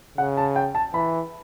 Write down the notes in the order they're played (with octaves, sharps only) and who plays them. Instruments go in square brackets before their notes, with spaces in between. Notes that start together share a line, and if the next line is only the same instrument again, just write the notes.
[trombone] C#3 [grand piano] F#5
[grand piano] A5
G5
A5
[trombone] E3 [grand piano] B5